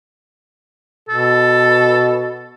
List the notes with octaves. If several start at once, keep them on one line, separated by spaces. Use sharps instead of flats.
B2 A4